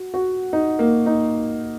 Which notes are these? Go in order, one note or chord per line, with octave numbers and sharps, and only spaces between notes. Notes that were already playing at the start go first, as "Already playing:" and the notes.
Already playing: F#4
F#4
D#4
A#3
D#4